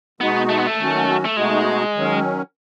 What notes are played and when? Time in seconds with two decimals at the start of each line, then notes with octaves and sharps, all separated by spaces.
0.20 B2 G#3 B3 D#4 F#4
0.49 A3
0.58 B3
0.67 A3
0.79 D#3 F#3 C#4 F#4
1.25 A3
1.37 B2 G#3 A3 D#4 F#4
1.95 D#3 F#3 C#4